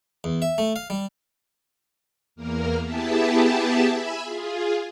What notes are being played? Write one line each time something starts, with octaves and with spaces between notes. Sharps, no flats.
E2
E5
A3
F5
G3
E2 A#3 A#4
B3 E4 G4 G#4 E5 A5
E5 G#5 B5
F4 G#4